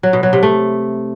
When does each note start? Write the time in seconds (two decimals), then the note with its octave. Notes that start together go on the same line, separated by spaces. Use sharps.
0.03 F#3
0.13 B2
0.23 F#3
0.33 C3
0.43 A3